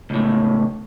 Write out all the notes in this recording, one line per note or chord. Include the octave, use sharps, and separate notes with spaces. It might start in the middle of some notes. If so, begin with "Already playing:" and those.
C#2 A2